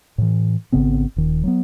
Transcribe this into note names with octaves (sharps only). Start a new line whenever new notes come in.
A2 E3
G#1 C#3 B3 C4
D#1 D#3
F#3 A#3 B3